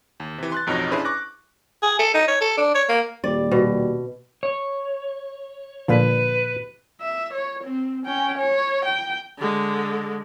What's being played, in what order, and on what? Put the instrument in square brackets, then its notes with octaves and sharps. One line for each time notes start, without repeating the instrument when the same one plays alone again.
[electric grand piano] D#2
C3 E3
C6 F#6 A6
A1 F2 B2 D#4 C#5 A#6
C#4 D4 E4 G#4 B4 C5
C#6 D6 F#6 A#6
[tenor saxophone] G#4
A4
D#4
C#5
A4
D4
C#5
A#3
[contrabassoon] D#1 [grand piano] G3 [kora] D5
[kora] B2
[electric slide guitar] C#5
[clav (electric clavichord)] A#2 D3 F3 [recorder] B4
[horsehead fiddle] E5
C#5
C4
C#4 G5
C#5
G5
[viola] D3 G#3